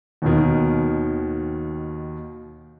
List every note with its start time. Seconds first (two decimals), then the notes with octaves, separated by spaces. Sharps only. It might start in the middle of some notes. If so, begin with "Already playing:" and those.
0.22 D#2 B2 D#3